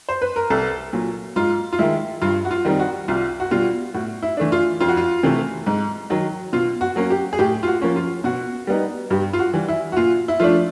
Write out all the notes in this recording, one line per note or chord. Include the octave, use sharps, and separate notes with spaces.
C5
B4
A#4
C2 A4
A#2 F#3
G#2 F4
F4
D#3 G#3 E4
G2 F4
F#4
F4
D#3 G3 C4 D#4
F#4
C2 F4
F#4
B2 G3 F4
A2 F#4
E4
E3 A3 D4
F4
F2 F4
F#4
F4
C3 E3 A3
G#2
D#3 F#3
B2 F4
F#4
F#3 A#3 C#4
G4
G#4
A2 G4
F4
F#4
F3 A#3 C#4
F4
B2 F#4
G3 B3 D#4
G2 G4
F4
F#4
E3 G3
E4
F#4
A#2 F4
E4
F3 A3 D4 F4